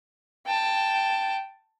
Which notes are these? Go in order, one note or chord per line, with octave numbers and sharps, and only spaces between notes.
G5 A5